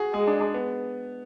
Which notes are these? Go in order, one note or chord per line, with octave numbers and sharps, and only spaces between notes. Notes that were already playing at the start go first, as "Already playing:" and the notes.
Already playing: F#4 G#4
G#3 G#4
D4
D4
B3